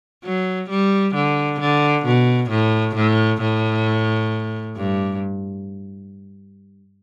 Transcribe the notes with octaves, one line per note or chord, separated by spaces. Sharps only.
F#3
G3
D3
D3
B2
A2
A2
A2
G2